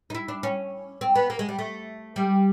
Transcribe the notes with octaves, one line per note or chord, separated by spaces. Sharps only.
D#4
E4
D4
C#4
C4
B3
A#3
G#3
G3
A3
G3